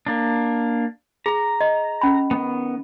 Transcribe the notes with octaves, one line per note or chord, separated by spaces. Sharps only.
A#3 D4
G#4 A#5
D#5
C#4 B5
D#3 B3